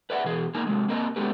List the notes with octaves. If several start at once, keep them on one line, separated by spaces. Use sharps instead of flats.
B4 D5 E5 F#5
B2 E3 G#4
A#3 D#4 A#4 G#5
C3 F#3 G#3
A#3 C4 A#4 D#5
G#3 A3 B3 C#4 G4 B4